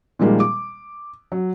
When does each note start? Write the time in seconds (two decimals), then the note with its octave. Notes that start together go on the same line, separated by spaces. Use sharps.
0.19 A#2 D#3 F3 G3 G#3 A#3
0.40 D6
1.32 F#3